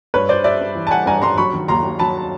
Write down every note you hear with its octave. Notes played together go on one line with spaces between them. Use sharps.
G2 B4 C#5
G3 C5 D5
G3 D5 E5
G2
E3
A5
G3 F#5 G#5
G2 G#5 A#5
G2 A#5 C6
F#3 B5 C#6
D#3
D#2 A#5 C6
D#2
F#3 A5 B5